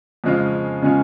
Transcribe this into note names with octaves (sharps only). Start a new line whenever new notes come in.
F2 C#3 G#3 C#4 F4
C#3 G#3 C#4 F4